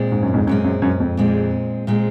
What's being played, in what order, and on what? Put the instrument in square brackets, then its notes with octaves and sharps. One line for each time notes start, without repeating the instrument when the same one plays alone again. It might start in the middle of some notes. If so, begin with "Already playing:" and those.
Already playing: [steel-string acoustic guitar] A#2 G#3 C4
[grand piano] G#2
F#2
F2 G#2
[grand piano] F#2 [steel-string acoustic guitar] A#2 G#3 C4
[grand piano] F#2
F#2
F2
[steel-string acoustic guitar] A#2 G#3 C4
A#2 G#3 C4